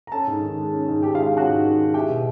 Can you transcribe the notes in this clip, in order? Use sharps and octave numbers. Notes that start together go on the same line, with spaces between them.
A#5
C#4 A4 A5
G#2
D#3
G#3
C#4
G#2
D#3 G4 G5
F4 F5
G#3
F4 F5
C#4 F#4 F#5
G#2
D#3
G#3
E4 G4 G5
B2